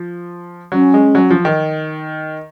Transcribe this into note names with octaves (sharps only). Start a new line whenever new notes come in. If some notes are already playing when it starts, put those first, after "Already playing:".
Already playing: F3
F#3 C#4
G#3
F#3
F3
D#3